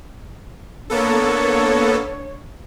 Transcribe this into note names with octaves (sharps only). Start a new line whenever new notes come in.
A#3 B3 D4 A4 C#5